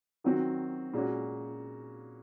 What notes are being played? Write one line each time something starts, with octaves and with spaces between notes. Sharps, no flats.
D#3 F#3 C4 F#4
A#2 G#3 C#4 F#4